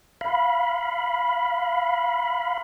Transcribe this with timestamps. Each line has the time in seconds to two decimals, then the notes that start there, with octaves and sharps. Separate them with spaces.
0.21 F5 B5